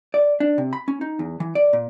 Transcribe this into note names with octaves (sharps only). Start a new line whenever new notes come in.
D5
D4
C3
B5
C#4
D#4
E2
E3
D5
A#2